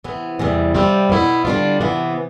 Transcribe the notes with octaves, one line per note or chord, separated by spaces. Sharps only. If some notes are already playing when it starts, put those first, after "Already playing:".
C3 E3 B3
E2 C3 G3
C3 G3 C4 F4
B2 B3 E4
D3 G3 D4 F4
C3 E3 B3